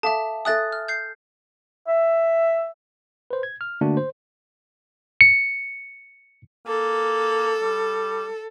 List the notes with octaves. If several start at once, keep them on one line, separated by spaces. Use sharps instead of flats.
A4 E5 F5 A5 D6
A4 E5 G#5 D#6 F#6 A6
F6
G6 C7
E5
B4 C5
G#6
F6
D3 A3 A#3 D4 F#4
C5
C#7
A#3 A4
G3